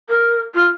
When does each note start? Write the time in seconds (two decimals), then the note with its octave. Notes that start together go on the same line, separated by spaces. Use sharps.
0.09 A#4
0.55 F4